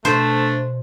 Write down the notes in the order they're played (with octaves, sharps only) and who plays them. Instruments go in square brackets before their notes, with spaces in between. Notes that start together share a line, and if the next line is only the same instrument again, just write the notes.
[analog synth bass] B2 [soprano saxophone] A3 [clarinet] D4 [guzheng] C5